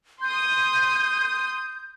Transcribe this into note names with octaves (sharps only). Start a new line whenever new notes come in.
C6 D#6 G6